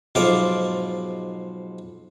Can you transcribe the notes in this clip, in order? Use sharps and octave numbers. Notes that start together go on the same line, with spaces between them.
B1 G#2 F3 F5 D6